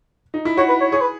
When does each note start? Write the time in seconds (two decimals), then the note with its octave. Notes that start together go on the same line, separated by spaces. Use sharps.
0.34 D#4
0.45 E4
0.57 F#4 C#5
0.69 B4
0.81 C#5
0.92 G#4 C#5
1.01 B4